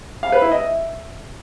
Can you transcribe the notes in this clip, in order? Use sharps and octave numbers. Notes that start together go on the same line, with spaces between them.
F5
B4
E4
D#5
E5